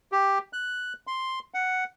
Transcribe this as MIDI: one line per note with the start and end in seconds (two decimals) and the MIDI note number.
0.12 0.39 67
0.53 0.93 90
1.07 1.39 84
1.54 1.84 78